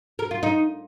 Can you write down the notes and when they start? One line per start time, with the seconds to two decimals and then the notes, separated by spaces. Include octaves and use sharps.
0.19 A#4
0.31 F4
0.43 D#4